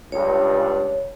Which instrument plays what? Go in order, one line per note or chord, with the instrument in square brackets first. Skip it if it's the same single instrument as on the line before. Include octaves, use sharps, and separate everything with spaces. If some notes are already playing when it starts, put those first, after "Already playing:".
[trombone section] C#2 G2 [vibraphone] C#5